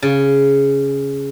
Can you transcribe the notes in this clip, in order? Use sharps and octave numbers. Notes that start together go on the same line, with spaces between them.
C#3